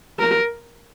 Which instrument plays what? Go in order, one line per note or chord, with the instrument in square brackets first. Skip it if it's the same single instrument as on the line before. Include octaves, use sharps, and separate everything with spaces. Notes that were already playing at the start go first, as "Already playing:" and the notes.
[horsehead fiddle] A#4